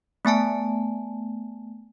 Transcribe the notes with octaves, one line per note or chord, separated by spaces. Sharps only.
A3 B3 G#5 A5